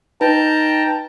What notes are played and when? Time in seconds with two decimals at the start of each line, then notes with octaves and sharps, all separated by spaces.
0.21 D#4 B4 G5 A5 A#5